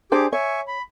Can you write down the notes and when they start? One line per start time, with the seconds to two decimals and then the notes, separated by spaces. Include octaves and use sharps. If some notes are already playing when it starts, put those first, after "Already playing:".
0.12 D4 G4 G#4 C5 G#5 D6
0.33 C#5 E5 G#5 C#6
0.68 B5